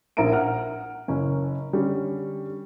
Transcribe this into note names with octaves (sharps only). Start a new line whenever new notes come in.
A#1 A#4 E5 A#5 D7
F#5 F6
F#1 C#4
D3 G3 C#4